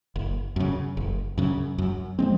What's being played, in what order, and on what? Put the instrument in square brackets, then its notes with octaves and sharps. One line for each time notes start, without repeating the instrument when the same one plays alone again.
[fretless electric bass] F#1
F#2 C#3
F#1
F#2 C#3
F#2
F3 G#3 C4